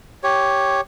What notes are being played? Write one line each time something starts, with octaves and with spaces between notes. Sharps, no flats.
G4 C#5